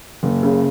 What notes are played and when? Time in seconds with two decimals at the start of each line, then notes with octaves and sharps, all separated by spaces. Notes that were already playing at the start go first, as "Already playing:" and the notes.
0.23 F#1
0.43 C#3